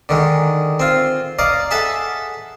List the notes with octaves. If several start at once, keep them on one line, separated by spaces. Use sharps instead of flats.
D3 D#3 G#3
C4 F4
D5 D#5 F5 A#5
G#4 A4 E5 F#5 A5